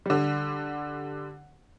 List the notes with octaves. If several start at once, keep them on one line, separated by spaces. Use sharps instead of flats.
D3 G3